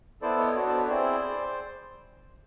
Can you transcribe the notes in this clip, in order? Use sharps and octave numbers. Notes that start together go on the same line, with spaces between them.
B3 E4 A4 C5 D5
C#5 D#5
B3 D4 F#4 A4 C5 D5
C5 D5
B4 C#5
C4 E4 G#4 C5 D5